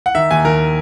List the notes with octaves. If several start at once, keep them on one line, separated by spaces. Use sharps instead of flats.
F#5
D#3 E5
D#2 G#5
D#2 A#4